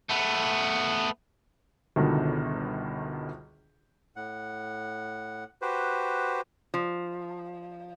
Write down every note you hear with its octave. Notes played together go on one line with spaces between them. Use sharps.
A3 B3
G1 C#2 B2 D3 D#3
A2 F#5
F#4 G4 B4 C5
F3